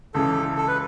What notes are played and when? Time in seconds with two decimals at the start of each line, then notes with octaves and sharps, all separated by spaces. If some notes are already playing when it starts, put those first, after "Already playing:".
0.14 C#2 C#3 E3 A4
0.57 A4
0.68 B4